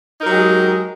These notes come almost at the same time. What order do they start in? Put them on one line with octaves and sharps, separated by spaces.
D#4 A#4 F#3 G4 G#3